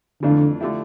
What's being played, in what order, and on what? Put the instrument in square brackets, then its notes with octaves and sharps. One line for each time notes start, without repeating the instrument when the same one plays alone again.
[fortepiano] F2 E3 A3 D4 F4 [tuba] D3
[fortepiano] D3 F3 A3 E4 G4